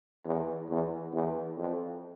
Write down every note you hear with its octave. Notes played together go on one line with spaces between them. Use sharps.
E2
E2
E2
F2